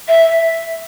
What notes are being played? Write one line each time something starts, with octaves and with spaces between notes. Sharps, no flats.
E5